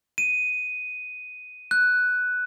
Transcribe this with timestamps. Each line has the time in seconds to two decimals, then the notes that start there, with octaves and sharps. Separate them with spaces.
0.18 D#7
1.71 F#6